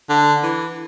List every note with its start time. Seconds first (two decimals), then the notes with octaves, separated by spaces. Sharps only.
0.10 D3
0.43 E3